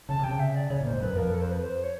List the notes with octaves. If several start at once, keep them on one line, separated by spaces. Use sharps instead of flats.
C#3 A5
C3 G5
C#3
E5
D5
C#3 C#5
A#2
G#2 C5
F#2 B4
F2 A#4
A4
C5
B4
C5
C#5